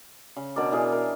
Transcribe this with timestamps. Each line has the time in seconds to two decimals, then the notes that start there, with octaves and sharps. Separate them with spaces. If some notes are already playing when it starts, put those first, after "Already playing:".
0.36 C#3
0.56 B2 D4 A#4 D5
0.72 B2 E3 G#4 A#4
0.92 A#4